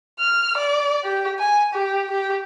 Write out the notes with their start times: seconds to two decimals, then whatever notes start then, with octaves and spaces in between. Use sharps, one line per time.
0.19 F6
0.57 D5
1.04 G4
1.39 G#5
1.74 G4
2.11 G4